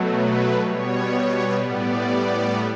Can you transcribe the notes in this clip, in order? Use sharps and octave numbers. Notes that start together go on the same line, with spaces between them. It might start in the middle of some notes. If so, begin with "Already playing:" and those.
Already playing: B2 F#3 A3
B4
B2 G3 B3 C#5
A2 G3 B3 D5